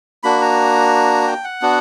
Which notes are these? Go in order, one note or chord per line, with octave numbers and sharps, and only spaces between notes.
A#3 D4 F#4 B5
A#5
G5
F#5
B3 D4 F#4